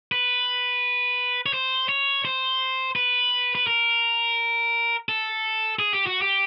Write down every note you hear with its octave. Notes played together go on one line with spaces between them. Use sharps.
B4
C#5
C5
C#5
C5
B4
B4
A#4
A4
G#4
G4
F#4
G4